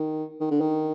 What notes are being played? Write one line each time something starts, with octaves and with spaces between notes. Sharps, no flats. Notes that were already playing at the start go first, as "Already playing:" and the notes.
Already playing: D#3
D#3
D3
D#3